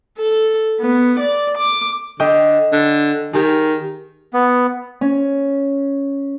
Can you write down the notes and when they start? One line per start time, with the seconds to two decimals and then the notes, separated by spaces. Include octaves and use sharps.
0.18 A4
0.81 B3
1.20 D5
1.59 D6
2.20 D3 D#5 G5 D6
2.72 D3
3.33 D#3 G4 G#4
4.33 B3
5.01 C#4